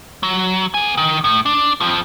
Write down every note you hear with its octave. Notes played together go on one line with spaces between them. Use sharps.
F#3
B3 G#5
D#3
A2
D4
F2 F3